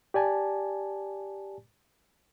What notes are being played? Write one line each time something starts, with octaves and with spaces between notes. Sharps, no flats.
G4 D5 G#5 A5